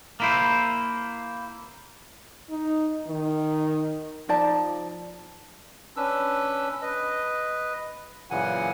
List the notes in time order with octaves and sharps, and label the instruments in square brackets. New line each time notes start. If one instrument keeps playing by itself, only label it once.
[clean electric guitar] A#3 E4 C5
[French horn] D#4
D#3
[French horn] F3 [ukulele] D#4 D5 A5
[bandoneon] C#4 D4 B4 E6
B4 D#5
F#2 A#2 C#3 E3 F#5 G#5